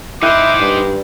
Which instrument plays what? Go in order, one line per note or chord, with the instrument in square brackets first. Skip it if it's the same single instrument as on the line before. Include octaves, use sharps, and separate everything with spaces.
[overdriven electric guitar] D#4 C5 [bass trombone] E4 [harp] G5 F#6 G6 [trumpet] D6
[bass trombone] G2